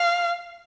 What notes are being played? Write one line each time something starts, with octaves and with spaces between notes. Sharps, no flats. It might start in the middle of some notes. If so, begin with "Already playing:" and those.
Already playing: F5